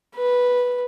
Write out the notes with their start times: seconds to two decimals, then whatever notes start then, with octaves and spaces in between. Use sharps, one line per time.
0.16 B4